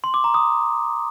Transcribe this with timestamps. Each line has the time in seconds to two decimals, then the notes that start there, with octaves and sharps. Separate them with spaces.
0.04 C6
0.14 D6
0.24 A#5
0.34 D#6